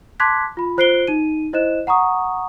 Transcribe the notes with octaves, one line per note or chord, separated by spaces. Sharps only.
A5 C6 D6 F#6 G#6 B6
F4 B5
F4 C5 F#6 C7 D7 G7
D#4 D#7
E4 C5 D#5 F#6 E7
F#5 A#5 C#6 D#6